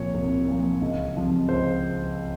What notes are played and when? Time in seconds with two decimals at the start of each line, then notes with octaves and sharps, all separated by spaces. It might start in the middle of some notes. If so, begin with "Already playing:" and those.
Already playing: C2 A#2 F3 C#5
0.14 C2
0.48 A#2 F3
0.81 C#2
1.16 C3 F3
1.48 C#2 C5